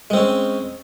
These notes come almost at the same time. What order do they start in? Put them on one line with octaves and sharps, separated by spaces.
G#3 C4 C#4